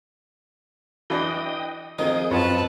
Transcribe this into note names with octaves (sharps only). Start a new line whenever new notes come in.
E3 D4 D#5 G5 D#6
F2 D#3 D#4 G#4 D#6
F#2 C4 F4 B4 C#5 A5